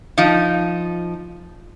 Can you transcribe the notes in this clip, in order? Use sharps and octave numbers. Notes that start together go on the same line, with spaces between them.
F3 D#4